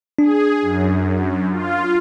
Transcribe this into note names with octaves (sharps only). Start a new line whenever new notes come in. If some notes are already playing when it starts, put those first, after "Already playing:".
D4 G#4
F#2
F4